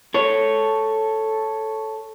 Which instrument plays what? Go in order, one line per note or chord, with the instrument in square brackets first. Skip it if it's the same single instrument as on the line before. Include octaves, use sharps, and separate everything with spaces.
[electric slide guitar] A4 C#5